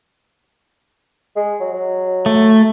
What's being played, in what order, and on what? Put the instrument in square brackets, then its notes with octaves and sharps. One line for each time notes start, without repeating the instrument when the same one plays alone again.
[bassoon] G#3
F#3
F#3
[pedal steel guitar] A3